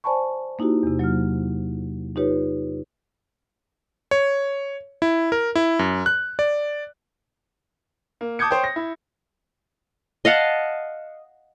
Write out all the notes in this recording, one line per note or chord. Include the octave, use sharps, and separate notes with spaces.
C5 D5 G#5 A5 B5 C#6
A#3 D#4 E4 F#4 G4
E2 C3
F#3 A#3 F#4 F6
D#4 F4 G4 B4 C#5
C#5
E4
A#4
E4
F#2
F#6
D5
A#3
A5 D6 D#6 G6 G#6 C#7
C5 C#5 G5
A#6
E4
D#5 F5 F#5 A5